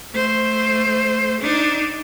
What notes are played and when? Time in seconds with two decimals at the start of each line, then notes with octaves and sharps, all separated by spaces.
0.13 A3 C5
1.41 D4 D#4